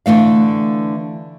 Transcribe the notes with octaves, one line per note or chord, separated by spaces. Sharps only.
D3 E3 A3 F5